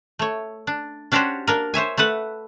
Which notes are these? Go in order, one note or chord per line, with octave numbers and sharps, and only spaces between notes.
A3 C#5
D4
C#4 D4 F#4 G4 C5 C#5
A#3 D4 A#4
C5 C#5 E5 G#5
A3 A4 B4 F#5